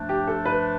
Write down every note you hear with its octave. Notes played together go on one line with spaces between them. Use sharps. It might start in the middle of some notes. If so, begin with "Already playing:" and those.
Already playing: G2 F3 A3 D4
G4
A4
B4